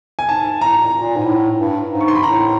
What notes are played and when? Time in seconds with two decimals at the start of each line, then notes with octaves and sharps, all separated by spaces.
0.19 G#5
0.29 G#2 A5
0.45 G#2
0.61 A2 A#5
0.77 A#2
0.93 A#2
1.16 G#2
1.26 A2
1.58 G2
1.90 G#2
2.01 C#6
2.08 C6
2.15 B5
2.23 A2 A#5